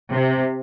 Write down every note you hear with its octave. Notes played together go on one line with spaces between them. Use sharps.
C3